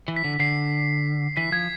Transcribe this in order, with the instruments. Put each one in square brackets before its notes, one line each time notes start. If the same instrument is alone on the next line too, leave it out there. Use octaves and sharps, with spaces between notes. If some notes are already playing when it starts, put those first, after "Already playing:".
[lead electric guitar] E3
[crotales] B6
[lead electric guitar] D3
[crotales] B6
[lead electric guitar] D3 [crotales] C7
[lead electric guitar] E3 [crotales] B6
[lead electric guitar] F3 [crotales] G#6